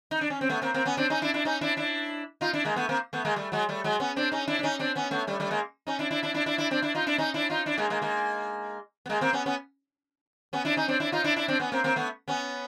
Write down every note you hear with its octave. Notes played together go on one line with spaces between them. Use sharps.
D#4
D4
C#4
C4
A3 B3
A#3 C4
A#3 C4
B3 C#4
C4 D4
C#4 D#4
D4 E4
D4 E4
C#4 D#4
D4 E4
D4 E4
D#4 F4
D4 E4
G#3 A#3
A3 B3
A#3 C4
A3 B3
G#3 A#3
G3 A3
F#3 G#3
G3 A3
F#3 G#3
B3 C#4
C4 D4
C#4 D#4
D4 E4
D4
C#4 D#4
C4 D4
B3 C#4
A3 B3
G3 A3
G3 A3
G#3 A#3
C#4 D#4
D4 E4
D4 E4
D4 E4
D4 E4
D4 E4
D4 E4
C4 D4
D4 E4
D#4 F4
D4 E4
C#4 D#4
D4 E4
D#4 F4
D4 E4
G#3 A#3
G#3 A#3
G#3 A#3
B3
G#3 A#3
A#3 C4
B3 C#4
B3 C#4
B3 C#4
D4 E4
C#4 D#4
C4 D4
D4 E4
D#4 F4
D4 E4
D4 E4
C4 D4
B3 C#4
A#3 C4
A#3 C4
A3 B3
B3 C#4